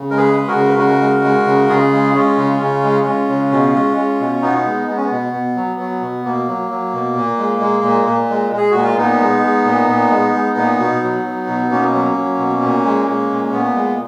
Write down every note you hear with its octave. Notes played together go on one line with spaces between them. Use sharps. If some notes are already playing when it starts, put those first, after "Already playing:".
Already playing: C#3
G#3 A#4
G#4 B4
G#3
F#4 A#4
C#3
B4
C#3 F#4 A#4
G#3
G#3
C#3
C#3 F4 G#4
G#3
G#3 C#4 F4
C#3
C#3
G#3
G#3
C#3
B2
G#3
G#3
B2
B2 B3 D#4
G#3
G#3 B3
C#4
B3
B2
B2
F#3
F#3
B2
B2 A#3
F#3
F#3
B2
A#2
G#3
G#3
A#2
A#2
G#3
G#3
G#4
A#2 F#4
F4
A#2 B3 D#4
G#3
G#3
A#2
A#2
G#3
G#3
A#2
B2
F#3
F#3
B2
B2 A#3 C#4
F#3
F#3
B2
A#2
G#3
G#3
A#2
A#3
A#2 B3
G#3